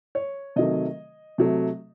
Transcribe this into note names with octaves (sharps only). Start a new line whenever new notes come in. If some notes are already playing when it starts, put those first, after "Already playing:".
C#5
C3 D#3 F#3 A3 D#5
C3 F#3 A3